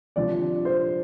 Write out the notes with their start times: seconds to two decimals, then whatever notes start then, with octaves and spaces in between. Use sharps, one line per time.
0.16 C3 F3 D4 D5
0.65 C5